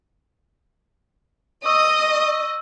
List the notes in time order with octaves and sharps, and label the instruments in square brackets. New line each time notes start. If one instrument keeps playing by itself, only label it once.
[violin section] D#5 [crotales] C#6 E6 [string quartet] D#6